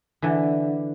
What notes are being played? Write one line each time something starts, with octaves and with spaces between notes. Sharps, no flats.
D3 E3